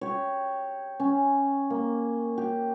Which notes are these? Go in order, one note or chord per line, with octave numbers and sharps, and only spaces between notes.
G4 C#5
C#4
A#3
G4